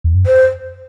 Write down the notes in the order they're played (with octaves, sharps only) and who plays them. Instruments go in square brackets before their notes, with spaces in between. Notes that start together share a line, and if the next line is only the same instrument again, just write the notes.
[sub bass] E2
F#2
[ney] C5